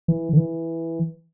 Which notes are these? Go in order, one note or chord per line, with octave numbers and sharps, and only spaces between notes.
E3
D3
E3